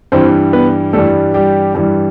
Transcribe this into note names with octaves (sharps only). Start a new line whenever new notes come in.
G2 E3 G3 C4 C5
B3 B4
G2 E3 G3 A3 A4
G3 G4
G2 E3 G3